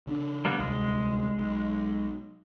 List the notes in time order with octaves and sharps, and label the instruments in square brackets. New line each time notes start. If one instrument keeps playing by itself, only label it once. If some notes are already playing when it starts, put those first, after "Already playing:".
[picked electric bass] C#3 C#4 D4
[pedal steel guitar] G3 A#3 B3
[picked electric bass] D1 C2 [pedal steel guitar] G#3
[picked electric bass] B1